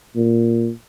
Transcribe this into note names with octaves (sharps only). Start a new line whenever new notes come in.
A#2